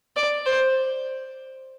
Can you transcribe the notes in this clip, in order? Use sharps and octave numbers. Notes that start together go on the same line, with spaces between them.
D5
C5